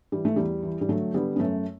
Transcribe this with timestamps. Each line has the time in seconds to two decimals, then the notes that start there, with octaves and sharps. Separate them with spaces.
0.12 E3 G3
0.25 A3
0.36 E2 G3
0.63 E3
0.81 G3
0.89 D3 F#3 A3
1.14 D3 G3 B3
1.36 B3
1.39 F#2 A3 C#4